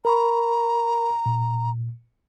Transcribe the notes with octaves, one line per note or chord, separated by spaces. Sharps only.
A#4 A#5 B5 C#6
A#2